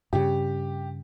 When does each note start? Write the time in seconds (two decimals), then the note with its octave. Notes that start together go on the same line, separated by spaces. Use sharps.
0.13 G2 C#3 G4